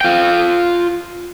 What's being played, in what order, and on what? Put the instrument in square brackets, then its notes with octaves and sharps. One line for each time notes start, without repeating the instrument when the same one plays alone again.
[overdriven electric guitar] F4 G5